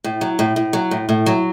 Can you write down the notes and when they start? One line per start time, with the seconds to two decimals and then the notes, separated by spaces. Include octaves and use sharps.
0.04 A2
0.21 F#3
0.39 A2
0.56 A2
0.73 F#3
0.91 A2
1.09 A2
1.26 F#3